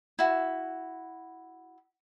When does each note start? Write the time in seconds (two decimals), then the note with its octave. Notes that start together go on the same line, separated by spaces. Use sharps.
0.19 E4 F#4